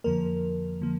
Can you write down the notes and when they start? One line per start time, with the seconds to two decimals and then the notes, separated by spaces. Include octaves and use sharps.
0.04 F2 D3 F3 A#3 A#4
0.81 D3 F3 A#3